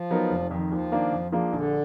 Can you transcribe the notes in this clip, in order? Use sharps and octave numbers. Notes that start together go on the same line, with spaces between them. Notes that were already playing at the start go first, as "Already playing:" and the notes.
Already playing: F3
F#3 B3 D#4 A#4
F1
F2 D#3
D#2 F3
D#3 A#3 D4
F2
F3 A#3 D4 G#4
A#1 D3